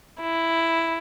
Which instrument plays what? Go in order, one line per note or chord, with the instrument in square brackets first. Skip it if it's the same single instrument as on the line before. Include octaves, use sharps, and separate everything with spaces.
[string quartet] E4